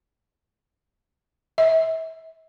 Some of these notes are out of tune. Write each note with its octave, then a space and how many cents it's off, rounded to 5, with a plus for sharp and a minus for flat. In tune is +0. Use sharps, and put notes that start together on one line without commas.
E5 -30